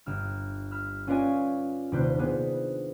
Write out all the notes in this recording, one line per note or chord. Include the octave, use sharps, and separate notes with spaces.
G1 E6 F6
B5 E6 F6
C#4 F4 B4 D5 D#5 G#5
D#1 C3 D4 B4 C5 G6
B3 D4 G#4 B4 C5